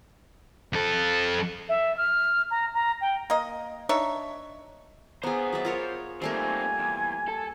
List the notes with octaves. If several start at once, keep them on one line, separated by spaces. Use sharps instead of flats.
F2 A4
E5
F6
A#5
A#5
G5
A#3 D#5
D4 D#4 C#5 E5
B3 G#4 C5 A#5
F#3 D5 E5
F4 A#4 C#5
G3 A3 A#3 C4 D#4 G#5
E2
A4